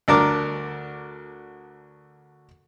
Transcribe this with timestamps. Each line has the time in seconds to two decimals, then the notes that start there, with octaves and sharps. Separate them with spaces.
0.08 D2 D4 A#4 D6